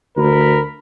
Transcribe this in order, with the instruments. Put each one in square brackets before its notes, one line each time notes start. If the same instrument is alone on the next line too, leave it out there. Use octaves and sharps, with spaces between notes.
[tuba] D2 [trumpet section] A#4 B5